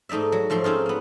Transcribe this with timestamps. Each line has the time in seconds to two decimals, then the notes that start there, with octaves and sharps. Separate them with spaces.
0.09 G#2 A3 D#4 D5 E5
0.32 F#3
0.50 G#2 F3 A3 C6
0.64 C4 C#4 D#4 F4
0.86 A#3 B3